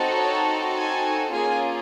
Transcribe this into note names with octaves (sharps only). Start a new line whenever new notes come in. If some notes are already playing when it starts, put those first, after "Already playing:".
Already playing: C4 D#4 F#4 A4
C#5
G#5
A#3 C#4 F4 G#4 G#5